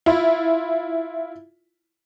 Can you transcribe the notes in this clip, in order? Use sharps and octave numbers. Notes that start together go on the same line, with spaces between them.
E4 F4